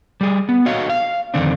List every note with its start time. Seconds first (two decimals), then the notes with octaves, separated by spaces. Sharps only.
0.21 G3 G#4
0.49 B3
0.66 F#4 C#5 D#5 F5
0.90 F5
1.34 F2 G#2 D3 D#3 C4 D4